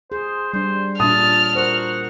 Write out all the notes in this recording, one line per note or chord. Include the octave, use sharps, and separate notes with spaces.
G#4 C5
G3 D4 C5
A#2 D4 A5 D#6 F6
F#4 A#4 C5